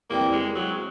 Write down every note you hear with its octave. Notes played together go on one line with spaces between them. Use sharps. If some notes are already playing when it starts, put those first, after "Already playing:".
E2 C3 E3 G3 A#3 C4
G#3
F#3